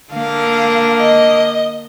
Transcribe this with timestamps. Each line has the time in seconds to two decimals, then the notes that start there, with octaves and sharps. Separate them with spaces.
0.13 D3 A#3 F5
1.00 D#5